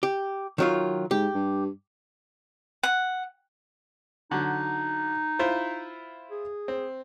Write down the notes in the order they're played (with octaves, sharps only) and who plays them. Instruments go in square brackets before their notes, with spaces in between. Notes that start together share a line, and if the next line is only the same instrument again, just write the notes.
[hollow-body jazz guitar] G4
D#3 F#3 F4
[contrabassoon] G#2 [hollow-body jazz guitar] G4
[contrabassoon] G2
[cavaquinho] F#5
[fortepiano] D3 F#3 [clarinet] D#4
[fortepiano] E4 F4 C5
[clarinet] G#4
[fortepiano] C4